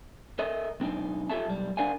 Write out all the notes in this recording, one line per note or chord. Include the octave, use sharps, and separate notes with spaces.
A4 A#4 D#5 E5
B1 C4 D4 D#4
F4 G4 A4 E5 A5
B1 G3
D4 A#4 D5 F5 F#5 G#5